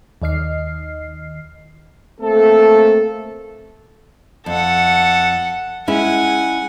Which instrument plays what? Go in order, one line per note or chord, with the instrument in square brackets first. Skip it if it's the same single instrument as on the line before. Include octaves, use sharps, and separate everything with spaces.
[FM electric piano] D#2 D#3 D#5 F6 C7
[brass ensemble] A3 A#3 C4 A4
[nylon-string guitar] F2 [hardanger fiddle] A4 F#5
[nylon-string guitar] G#3 C#4 E4 [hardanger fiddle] F#5 G#5